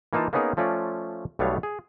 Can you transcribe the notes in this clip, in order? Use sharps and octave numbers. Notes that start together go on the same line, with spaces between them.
E3 A#3 D#4 F4 A5
A#3 B3 C#4 D#4 G#4 A#4
F3 A3 C#4 F4 D5
B1 G3 A3 B3 C#5 F5
G#4